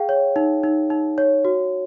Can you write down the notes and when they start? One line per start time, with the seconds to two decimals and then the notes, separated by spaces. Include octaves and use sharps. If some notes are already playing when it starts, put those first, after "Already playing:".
Already playing: G#4 F5 G5
0.09 C#5
0.36 D#4
0.64 D#4
0.90 D#4
1.18 C#5
1.45 F#4